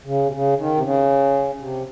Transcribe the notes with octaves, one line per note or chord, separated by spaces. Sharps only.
C#3
C3
C#3
D#3
C3
C#3
C3